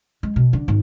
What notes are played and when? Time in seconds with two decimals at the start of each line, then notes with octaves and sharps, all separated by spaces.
0.23 G#3
0.36 B2
0.53 D3
0.68 G#1